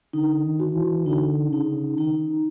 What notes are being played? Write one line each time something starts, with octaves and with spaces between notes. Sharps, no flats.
D3 D#4
D#3
F#4
E3
D3 D#4
C#3 D#4
D#3 D#4